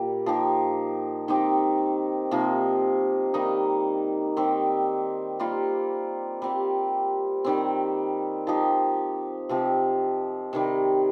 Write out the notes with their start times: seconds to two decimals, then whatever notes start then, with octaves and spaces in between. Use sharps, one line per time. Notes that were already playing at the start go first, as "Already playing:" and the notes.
Already playing: A#2 G3 A#3 G4
0.26 F3 A#3 D#4 G4
1.28 D#3 C4 D#4 G4
2.31 C3 F3 A#3 D#4
3.34 D#3 G3 A#3 D#4
4.37 D#3 C4 G4
5.40 G3 A#3 F4
6.42 G3 C4 G4
7.45 D#3 G3 C4
8.47 F3 D#4 G4
9.49 C3 F3 C4 G4
10.53 C3 D#3 G3